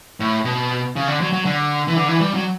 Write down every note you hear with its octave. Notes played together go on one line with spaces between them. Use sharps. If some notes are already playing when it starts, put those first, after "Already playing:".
A2
B2
C#3
D3
F#3
F#3
D3
E3
D3
E3
G3
F#3